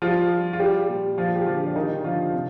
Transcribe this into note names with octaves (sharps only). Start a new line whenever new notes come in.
F3 G3 F4
G3
F4
G3 G4
A#2
F3 F4
G4
D3 F3 F4
D4
D#3 G3 D#4
D3 F3 F4
C3